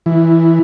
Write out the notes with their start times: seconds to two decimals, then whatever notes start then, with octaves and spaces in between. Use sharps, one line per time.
0.06 E3